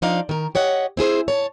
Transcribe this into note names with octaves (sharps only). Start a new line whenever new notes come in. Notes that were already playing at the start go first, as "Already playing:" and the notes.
F3 D4 D#4 D5 F5
D#3 A#4
G4 C#5 D#5 F#5
C4 E4 G#4 C5
C#5 A5